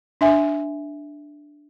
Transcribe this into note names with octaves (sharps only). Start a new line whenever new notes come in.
D4 E5 G#5